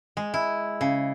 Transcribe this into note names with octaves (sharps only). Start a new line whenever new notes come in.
G#3
E4
C#3